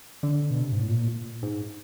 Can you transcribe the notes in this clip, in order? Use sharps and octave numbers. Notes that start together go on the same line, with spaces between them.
D3
B2
C3
G#2
A2
A#2
G#2